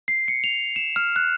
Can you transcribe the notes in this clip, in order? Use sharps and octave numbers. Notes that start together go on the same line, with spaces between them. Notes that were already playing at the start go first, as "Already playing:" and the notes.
C7
C#7
F7
E7
F6
F#6